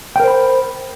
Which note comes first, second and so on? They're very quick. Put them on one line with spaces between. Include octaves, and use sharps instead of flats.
G5 A#4 C5 B5